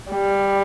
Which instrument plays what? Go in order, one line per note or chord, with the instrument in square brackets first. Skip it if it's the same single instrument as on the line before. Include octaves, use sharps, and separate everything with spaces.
[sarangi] G3